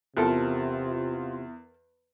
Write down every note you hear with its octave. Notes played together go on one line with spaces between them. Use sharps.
E2 C3 F4 A4 A#4 G5